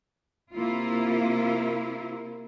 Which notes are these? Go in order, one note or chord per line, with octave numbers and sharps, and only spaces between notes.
C3 A#3 E4 F4